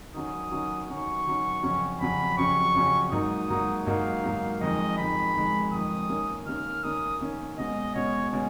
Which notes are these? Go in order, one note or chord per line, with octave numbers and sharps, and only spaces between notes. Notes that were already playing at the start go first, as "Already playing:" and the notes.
D#3 F#3 C#4 D#6
D#3 F#3 C#4
D#3 F#3 C#4 C#6
D#3 F#3 C#4
F2 C#3 F#3 C#4
F2 C#3 F#3 C#4 B5
F2 C#3 F#3 C#4 C#6
F2 C#3 F#3 C#4
G#2 F#3 A#3 D#4 D#6
G#2 F#3 A#3 D#4
G#2 F#3 A#3 D#4 F5
G#2 F#3 A#3 D#4
F2 D#3 G#3 D#5
F2 D#3 G#3 B5
F2 D#3 G#3
F2 D#3 G#3 D#6
D#3 A#3 C#4
D#3 A#3 C#4 F6
D#3 A#3 C#4 D#6
D#3 A#3 C#4
B2 G#3 C#4 D#5
B2 G#3 C#4 C#5
B2 G#3 C#4